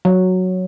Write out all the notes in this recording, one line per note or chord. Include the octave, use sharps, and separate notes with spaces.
F#3